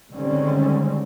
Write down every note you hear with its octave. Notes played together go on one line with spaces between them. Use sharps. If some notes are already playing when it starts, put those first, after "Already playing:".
D3 D#3 G3 G#3 C4 C#4